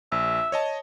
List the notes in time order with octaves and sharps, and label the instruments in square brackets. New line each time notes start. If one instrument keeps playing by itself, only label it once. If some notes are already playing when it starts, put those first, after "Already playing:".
[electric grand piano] A#1 [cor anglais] E5
[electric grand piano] C#5 D#5 A5